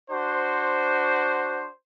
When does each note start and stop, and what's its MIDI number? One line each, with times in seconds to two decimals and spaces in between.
0.11 1.67 62
0.11 1.67 66
0.11 1.67 72